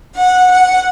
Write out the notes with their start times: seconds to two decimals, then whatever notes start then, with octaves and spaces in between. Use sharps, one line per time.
0.16 F#5
0.50 F#5